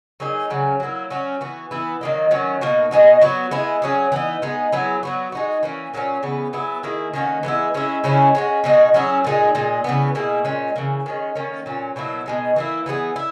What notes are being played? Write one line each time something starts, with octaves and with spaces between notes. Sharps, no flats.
F#3 A#3 D#4 G#4
C#3 F#3 C#4
F#3 A#3 E4
F#3 C#4 F#4
E3 B3 F#4
E3 B3 E4
D#3 F#3 A#3 D#4
D#3 F#3 C#4
B2 A#3 D#4 F#4
B2 G#3 D#4 F#4
F#3 B3 F#4
G#3 B3 E4
F#3 C#4 G#4
E3 B3 D#4
G#3 B3 D#4
F#3 B3 E4 G#4
F#3 B3 F#4
G#3 D#4 F#4
E3 A#3 C#4
A#2 F#3 A#3 C#4
C#3 E3 B3
F#3 B3 E4 G#4
D#3 A#3 E4 G#4
D#3 A#3 C#4 F#4
E3 G#3 B3 E4
G#3 C#4 E4
C#3 G#3 C#4 E4
G#3 C#4 F#4
B2 G#3 D#4 F#4
F#3 C#4 E4 G#4
A#2 G#3 D#4 G#4
A#2 G#3 D#4
C#3 E3 B3
B2 A#3 E4 G#4
A#2 G#3 C#4
C#3 E3 A#3
D#3 G#3 C#4
D#3 A#3 C#4
A#2 F#3 C#4
B2 F#3 A#3 E4
B2 G#3 D#4
E3 A#3 E4
E3 B3 D#4 G#4
E4